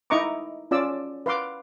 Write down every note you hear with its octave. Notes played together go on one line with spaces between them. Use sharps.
D#4 E4 D#5 A#5 C#6 D6
C#4 F4 D5 E6
B4 F5 C6 D6